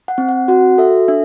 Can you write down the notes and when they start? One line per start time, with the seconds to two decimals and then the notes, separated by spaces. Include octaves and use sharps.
0.08 F#5
0.18 C4
0.29 F#5
0.48 F#4 F#5
0.78 A4 E5
1.08 D4 E5